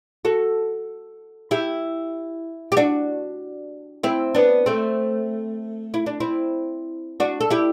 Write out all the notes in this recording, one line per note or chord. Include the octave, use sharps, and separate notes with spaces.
F#4 A4
E4 G4
G4
D4 F#4
C4 E4
B3 D4
A3 C4
E4
D4
C4 E4
D4 F#4
A4
E4 G4